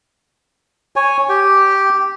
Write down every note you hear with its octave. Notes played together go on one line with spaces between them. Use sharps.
C#5 G#5
G4 G5